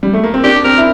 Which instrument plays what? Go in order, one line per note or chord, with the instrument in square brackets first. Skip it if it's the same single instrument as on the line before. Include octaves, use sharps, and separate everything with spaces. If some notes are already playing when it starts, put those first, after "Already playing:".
[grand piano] G3
A3
A#3
C4
[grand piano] D4 [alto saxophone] G4
[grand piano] C4 [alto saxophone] A#4
[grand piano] E4